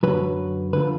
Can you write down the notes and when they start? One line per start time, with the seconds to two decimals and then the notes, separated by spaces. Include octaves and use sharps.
0.03 F#2 D3 F#3 B4
0.73 D3 F3 A3 B4